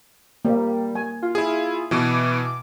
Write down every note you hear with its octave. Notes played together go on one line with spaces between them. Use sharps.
G3 A#3
G#5
F4
E4 G#4
B2 E3 D6